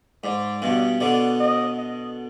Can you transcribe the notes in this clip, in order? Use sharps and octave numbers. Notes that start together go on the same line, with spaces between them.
G#2 D5
G2 B2
B2 D3 D5
D#5
D#5